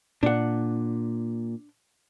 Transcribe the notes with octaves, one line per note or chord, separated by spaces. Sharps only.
A#2 D4 F#5